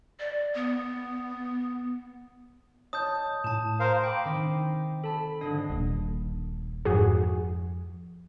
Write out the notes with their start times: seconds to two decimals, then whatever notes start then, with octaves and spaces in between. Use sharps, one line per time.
0.20 D5
0.55 B3
2.93 C#5 D#5 A5 D#6 G6
3.44 A2 A5 E7
3.80 A#4 C5 F5
4.04 G5 B5 D6
4.25 D#3 C4 D#4
5.04 A4 A5 B5
5.41 G#1 D3 D4 D#5
5.70 D#1 A#1
6.85 F2 G#2 F#4 G#4